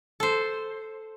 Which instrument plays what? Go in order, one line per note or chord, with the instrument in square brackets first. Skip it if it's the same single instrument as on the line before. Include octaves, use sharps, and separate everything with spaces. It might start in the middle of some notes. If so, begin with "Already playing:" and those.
[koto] A4 C5